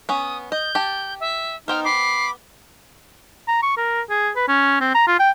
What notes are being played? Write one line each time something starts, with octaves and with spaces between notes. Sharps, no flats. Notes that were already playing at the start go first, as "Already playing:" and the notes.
B3 C#4 D#6
D#5 G6
G4 A5
E5
B3 D#4 C5 G5 F6
B5 D6 C7
A#5
C#6
A#4
G#4
B4
C#4
C4
A#5
F4
G5